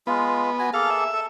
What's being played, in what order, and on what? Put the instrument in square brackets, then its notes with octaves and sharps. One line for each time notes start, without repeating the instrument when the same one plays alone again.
[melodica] G#3 F4 [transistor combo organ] B3
[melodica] F#4 G#5
[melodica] A#3 G#4 A4 [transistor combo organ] F5 A5
[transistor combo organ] E5
[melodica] A4